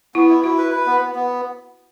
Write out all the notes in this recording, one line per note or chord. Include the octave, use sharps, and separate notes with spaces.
B3 E4
E4
E4 F#4
B4
B4
B3
B3
B3